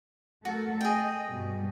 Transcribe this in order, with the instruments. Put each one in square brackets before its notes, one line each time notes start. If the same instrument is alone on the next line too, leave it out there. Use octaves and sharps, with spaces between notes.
[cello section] A3 A4 A#4 [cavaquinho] F#4
[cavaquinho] G#4 G5 [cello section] D#5
[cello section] G2 B2 G3